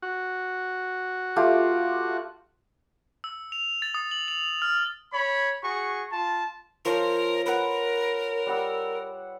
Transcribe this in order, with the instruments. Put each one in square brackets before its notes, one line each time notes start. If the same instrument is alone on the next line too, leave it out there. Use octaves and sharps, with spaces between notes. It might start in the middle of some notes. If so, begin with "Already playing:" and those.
[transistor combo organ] F#4
[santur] A3 F4 G4
[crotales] E6
F7
A6
D#6
F#7
F7
F6
[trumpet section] C#5 B5
F#4 G#4 C#6
F4 A5
[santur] F3 C5 C#5 [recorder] A#4
[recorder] A#4 [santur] B4 F#5
[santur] G3 F#5 E6